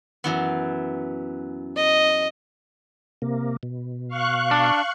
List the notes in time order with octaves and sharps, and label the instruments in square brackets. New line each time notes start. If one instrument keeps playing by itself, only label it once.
[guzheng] F#2 E3 B3
[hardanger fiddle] D#5
[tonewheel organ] C3 A#3
B2
[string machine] F5 C#6 F#6
[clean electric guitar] D4